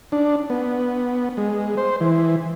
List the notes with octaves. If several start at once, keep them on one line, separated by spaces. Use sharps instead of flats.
D4
B3
G#3
C5
E3